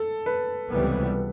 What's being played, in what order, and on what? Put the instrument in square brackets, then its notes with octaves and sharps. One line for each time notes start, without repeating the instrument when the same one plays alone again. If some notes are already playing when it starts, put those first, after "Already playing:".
Already playing: [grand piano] A4
B4
[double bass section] C#2 C3 E3 G3 B3